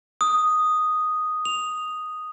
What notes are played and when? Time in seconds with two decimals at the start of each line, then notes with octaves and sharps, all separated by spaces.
0.21 D#6
1.45 F7